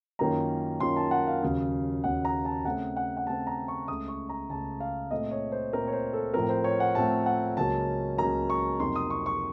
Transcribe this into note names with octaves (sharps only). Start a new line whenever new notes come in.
F#2 D#3 A#3 C#4 F4 A#5
F#2 D#3 A#3 C#4 F4 C6
A5
F#5
F5
D#2 C#3 F#3
D#2 C#3 F#3 F#5
A#5
A5
C#3 A3 C4 F#5
F#5
F#5
C#3 A3 C4 A5
A#5
C#6
C#2 C#3 A3 D#6
C#6
A#5
C#2 C#3 A3 A5
F5
A#2 A3 C4 D#5
C#5
C5
A#2 A3 C4 A#4
C#5
C5
A4
A2 F3 A3 C4 A#4
C5
C#5
F#5
A2 F3 A3 C4 A5
F#5
C#2 C#3 F#3 A#3 C#4 A5
C#2 C#3 F#3 A#3 C#4 A#5
C#6
F2 C3 F#3 A#3 D#4 C6
D#6
C#6
C#6